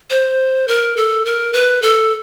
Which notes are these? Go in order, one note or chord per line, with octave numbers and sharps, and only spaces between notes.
C5
A#4
A4
A#4
B4
A4